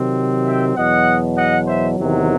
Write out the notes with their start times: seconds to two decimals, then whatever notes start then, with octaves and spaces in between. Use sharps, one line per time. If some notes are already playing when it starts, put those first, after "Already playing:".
Already playing: C3 D#3 F#3 C4
0.46 E5 G5
0.77 E2 B2 F#3 D#5 F#5
1.37 D#5 F#5
1.67 C5 E5
1.97 E2 C3 D#3 F#3